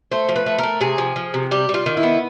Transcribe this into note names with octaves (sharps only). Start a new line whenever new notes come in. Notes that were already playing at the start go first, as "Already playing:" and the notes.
A3 C5
F3
B4
A3
A3 A#4
C3 G#4
F3
F3
C3
G3 G4
G3
F4
D#3
E4
B3